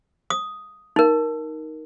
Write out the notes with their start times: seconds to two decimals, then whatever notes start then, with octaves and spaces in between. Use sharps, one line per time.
0.30 D#6
0.96 D#4 A#4